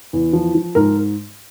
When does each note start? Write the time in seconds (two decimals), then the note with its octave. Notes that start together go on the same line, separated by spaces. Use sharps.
0.13 E2
0.33 F3
0.55 F3
0.75 G#2 A#4